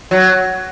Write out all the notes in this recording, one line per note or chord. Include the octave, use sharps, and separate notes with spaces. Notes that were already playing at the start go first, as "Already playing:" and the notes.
F#3